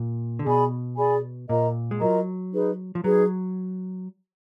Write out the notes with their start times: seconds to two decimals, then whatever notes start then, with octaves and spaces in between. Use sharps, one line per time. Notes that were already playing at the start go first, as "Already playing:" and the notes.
Already playing: A#2
0.39 D3
0.46 B2 G#4 D5 G#5 B5
0.98 G#4 D5 G#5 B5
1.49 A#2 F4 A#4 D#5 A#5
1.91 G#3
2.01 F#3 F4 A#4 D#5 A#5
2.53 D#4 G#4 B4
2.95 F3
3.04 F#3 D#4 G#4 B4